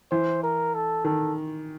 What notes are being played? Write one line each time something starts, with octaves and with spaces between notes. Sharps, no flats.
E3 C5
A#4
A4
D#3 A4